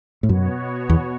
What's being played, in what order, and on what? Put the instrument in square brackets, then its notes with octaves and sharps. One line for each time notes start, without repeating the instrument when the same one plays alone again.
[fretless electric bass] A2
[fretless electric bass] F#2 [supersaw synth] B2 B3 F#4 C#5
[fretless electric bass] E2